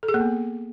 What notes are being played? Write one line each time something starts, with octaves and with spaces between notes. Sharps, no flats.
A4
G#4
A#3
B3